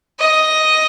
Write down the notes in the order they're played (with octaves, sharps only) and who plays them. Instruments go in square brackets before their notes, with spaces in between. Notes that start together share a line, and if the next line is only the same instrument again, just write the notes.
[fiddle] D#5